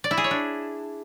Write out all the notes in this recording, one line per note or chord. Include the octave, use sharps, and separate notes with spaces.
D5
E4
G#4
C#5
D4